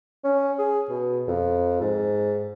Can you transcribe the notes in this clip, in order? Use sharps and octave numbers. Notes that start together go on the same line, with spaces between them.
C#4
G#4
B2
F2
G#2